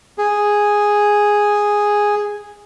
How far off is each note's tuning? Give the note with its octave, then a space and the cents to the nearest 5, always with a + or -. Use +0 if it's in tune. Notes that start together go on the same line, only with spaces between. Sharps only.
G#4 -5